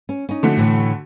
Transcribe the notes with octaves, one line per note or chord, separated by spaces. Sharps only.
C#4
C#4 D#4
D3 A3 F#4
A2 E3